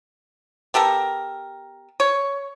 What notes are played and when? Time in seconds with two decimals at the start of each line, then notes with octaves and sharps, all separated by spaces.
0.74 B3 G4 A4 A#4
2.00 C#5